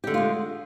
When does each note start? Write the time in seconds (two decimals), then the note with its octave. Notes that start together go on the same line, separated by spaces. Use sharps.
0.04 G4
0.07 D3
0.11 A3
0.14 F4
0.17 G#3